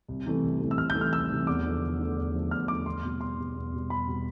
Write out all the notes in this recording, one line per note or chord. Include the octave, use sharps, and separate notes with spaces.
C2
C3 E3 A3
C2
C3 E3 A3
E6
C2 F6
G6
C3 E3 A3
F6
C2 E6
C3 E3 A3
E2 D6
D3 F3 A3
E2
D3 F3 A3
E2
D3 F3 A3
E2 F6
D3 F3 A3 D6
E2 C6
B2 G3
E2 C6
B2 G3
E2
B2 G3
E2 B5
B2 G3